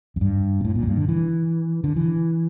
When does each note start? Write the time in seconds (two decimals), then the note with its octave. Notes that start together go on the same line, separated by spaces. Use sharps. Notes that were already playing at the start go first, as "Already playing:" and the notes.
0.16 F2
0.21 G2
0.60 A#2
0.65 A2
0.75 A#2
0.83 F2
0.87 G2
0.97 D3
1.09 E3
1.84 D3
1.96 E3